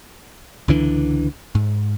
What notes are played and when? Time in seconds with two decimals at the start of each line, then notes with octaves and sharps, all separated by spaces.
0.68 C#2 D3 E3 D4
1.55 G#2